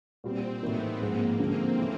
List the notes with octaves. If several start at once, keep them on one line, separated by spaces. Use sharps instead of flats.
A#2 G3 B3 C4
A2 E3 G3 A#3 B3 D#4
G#2 F3 G#3 A#3
D3 F3 G#3 C4
E3 A3 C#4 E4